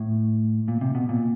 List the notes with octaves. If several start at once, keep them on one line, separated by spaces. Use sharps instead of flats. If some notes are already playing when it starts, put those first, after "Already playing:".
Already playing: A2
A#2
C3
B2
A#2